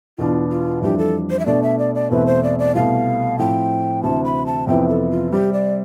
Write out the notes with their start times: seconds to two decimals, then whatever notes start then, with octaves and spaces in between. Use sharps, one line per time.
0.18 E2 B2 B3 D4 F4
0.50 F4
0.82 F2 E3 G3 D4 G4
0.98 A4
1.30 C5
1.39 E5
1.46 B2 A3 D4 D5
1.63 E5
1.79 D5
1.95 D5
2.11 E2 B2 A3 C4 E4 B4
2.27 C5
2.43 D5
2.59 D5
2.75 C2 B2 A3 F5
3.39 A2 F3 C4 G5
4.03 D2 C3 E3 A5
4.24 B5
4.46 A5
4.67 F2 C3 E3 B3 G5
4.89 A4
5.11 F4
5.32 C3 G3 C4 G4
5.53 D5